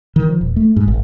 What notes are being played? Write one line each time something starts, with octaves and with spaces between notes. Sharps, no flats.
D#3
F3
D#1
A3
G#2
G#1